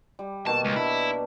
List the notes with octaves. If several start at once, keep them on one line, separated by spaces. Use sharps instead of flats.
G3
B2 D#3 A#3 A5
C#2
D4 E4